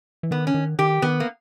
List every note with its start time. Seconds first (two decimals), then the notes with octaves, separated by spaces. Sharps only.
0.23 E3
0.31 D#3 B3
0.47 C#4
0.54 D#3
0.79 D#3 G4
1.02 D#3 B3
1.20 A#3